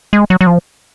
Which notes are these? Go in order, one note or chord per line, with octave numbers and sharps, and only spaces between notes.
G#3
F#3
F#3
F3